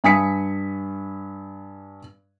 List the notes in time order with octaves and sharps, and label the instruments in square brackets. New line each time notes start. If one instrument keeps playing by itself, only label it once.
[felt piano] G2 G#5 D#6 B6 C#7